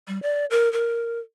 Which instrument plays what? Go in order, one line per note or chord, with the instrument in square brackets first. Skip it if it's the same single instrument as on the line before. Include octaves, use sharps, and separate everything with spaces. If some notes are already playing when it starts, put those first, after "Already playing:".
[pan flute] G3
D5
A#4
A#4